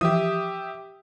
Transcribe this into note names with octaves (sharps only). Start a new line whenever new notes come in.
E3 F3 G4 E5 D#6